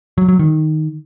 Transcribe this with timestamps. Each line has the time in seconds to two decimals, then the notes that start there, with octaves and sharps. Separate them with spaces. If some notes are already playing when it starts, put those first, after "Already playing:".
0.18 F#3
0.29 F#3
0.39 D#3